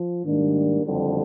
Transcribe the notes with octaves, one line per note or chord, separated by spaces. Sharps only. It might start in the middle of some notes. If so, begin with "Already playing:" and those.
Already playing: F3
G#2 D#3 G3 A#3 D4
F#1 F2 D3 G3